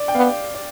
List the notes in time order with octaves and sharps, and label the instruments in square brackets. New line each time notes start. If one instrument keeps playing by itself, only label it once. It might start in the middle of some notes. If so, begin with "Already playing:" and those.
Already playing: [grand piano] D5
G5
[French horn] B3 [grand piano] F5
[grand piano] D5